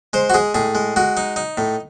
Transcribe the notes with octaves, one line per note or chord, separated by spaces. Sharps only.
G#3 C5
F#4
G#3 G#4
A2 G#4
G#3
G#3 F#4
D#4
D#4
A2